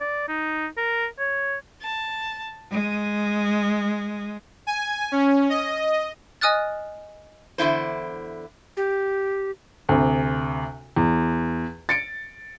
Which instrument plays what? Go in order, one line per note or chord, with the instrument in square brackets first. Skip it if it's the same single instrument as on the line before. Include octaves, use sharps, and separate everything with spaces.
[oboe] D5
D#4
A#4
C#5
[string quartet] A5
G#3
[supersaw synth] G#5
C#4
D#5
[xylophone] D#5 G#5 D#6 F6 F#6 A6
[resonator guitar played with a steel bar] E2 D3 E4 C5
[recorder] G4
[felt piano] D2 C3
E2
A6 C#7 D7